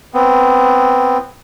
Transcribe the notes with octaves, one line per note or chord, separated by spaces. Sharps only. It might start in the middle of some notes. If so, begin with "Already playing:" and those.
B3 C4